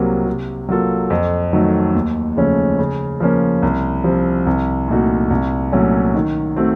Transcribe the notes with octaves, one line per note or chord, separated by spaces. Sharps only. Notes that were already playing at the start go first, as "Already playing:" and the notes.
Already playing: C2 C3 F#3 A#3
C3
F#3 A#3 F4 A4
F2
D#3 F#3 A3
D#2
C#3 F3 A3 C#4
C#3
F3 A#3 C#4
C2
C3 F3 C4
C2
A#2 A3 D#4 F#4
C2
A#2 F#3 A3 C#4
D#3
A3 C4 F#4